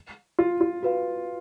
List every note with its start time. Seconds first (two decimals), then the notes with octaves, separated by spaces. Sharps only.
0.39 F4
0.61 F4
0.83 F#4 B4 F5